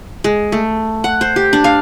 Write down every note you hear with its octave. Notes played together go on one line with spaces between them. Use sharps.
G#3
A3
F#5
C5
G4
D4
F5